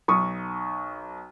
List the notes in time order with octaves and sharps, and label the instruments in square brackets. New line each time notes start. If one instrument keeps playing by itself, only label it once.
[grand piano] B1 C#6 D#6